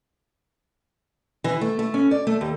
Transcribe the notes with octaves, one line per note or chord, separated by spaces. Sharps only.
E3
A3
A3
C#4
D5
A3
D#2